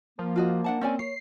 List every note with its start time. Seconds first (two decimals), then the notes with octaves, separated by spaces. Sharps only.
0.19 F3 A#3
0.36 F4 F#4 D#5
0.64 D4 F#5 A5
0.81 C4 C#4 D5 G#5
0.99 C#5 C7